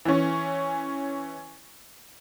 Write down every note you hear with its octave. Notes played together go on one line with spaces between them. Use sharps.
E3 C#4